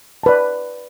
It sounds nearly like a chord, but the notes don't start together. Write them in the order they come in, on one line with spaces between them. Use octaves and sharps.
A5 B4 D5